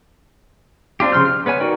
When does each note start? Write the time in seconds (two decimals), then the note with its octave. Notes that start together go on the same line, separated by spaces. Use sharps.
1.00 C4 D4 F4 G4
1.12 C#3 F3 C6 F6 G6
1.26 F6
1.46 B3 B4 C#5 G#5
1.60 D#4 F#4 A#4 D5 G5